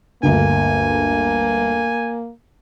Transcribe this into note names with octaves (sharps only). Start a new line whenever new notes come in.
G1 D2 A#3 G#5